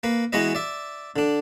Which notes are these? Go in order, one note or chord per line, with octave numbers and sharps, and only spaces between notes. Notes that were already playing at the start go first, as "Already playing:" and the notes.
A#3 B4
E3 G#3 B3 F#4 B4 D#5
D5 E5
D3 D4